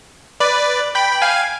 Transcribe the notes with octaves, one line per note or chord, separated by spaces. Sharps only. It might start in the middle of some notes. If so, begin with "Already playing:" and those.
B4 D5
G5 B5
G5
F5 G#5